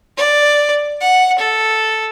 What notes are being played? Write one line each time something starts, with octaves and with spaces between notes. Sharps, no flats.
D5
F#5
A4